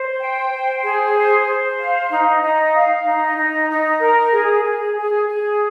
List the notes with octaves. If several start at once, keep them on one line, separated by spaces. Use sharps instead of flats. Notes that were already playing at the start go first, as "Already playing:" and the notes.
Already playing: C5
G5
C5
G#4
C5
C5
F5
D#4
D#4
F5
D#4
D#4
D#4
A#4
G#4
G#4
G#4
G#4